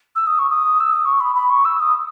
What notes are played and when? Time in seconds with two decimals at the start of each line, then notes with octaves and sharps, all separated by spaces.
0.16 E6
0.27 D#6
0.39 C#6
0.50 D#6
0.80 E6
0.93 D#6
1.05 C#6
1.21 B5
1.35 B5
1.50 C#6
1.65 E6
1.80 D#6